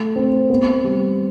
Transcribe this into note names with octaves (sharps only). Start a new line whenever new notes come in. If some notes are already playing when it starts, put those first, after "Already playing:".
Already playing: A3
C4
B3
G3